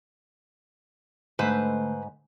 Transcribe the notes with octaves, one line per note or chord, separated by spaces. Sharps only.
G#2 D3 A3 B4 C5